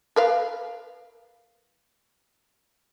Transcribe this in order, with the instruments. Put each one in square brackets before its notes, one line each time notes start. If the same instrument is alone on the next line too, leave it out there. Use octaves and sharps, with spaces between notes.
[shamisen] A#4 B4 F5